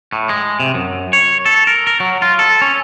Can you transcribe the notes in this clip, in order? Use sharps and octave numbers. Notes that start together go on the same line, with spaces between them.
A2
G#3
C3
F#2
C#5
A4
A#4
A#4
F#3
F4
A4
C#4